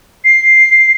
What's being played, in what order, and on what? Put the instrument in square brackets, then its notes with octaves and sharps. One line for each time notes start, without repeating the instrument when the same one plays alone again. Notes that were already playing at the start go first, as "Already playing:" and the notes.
[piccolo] C7